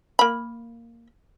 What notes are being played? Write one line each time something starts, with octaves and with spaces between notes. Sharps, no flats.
A#3 B5